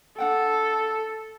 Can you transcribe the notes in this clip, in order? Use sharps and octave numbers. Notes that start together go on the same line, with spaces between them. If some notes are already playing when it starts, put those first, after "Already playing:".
D4 A4 F#5 G5